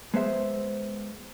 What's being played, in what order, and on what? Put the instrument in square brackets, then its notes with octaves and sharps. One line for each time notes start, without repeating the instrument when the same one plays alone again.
[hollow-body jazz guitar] G#3 B3 C5 E5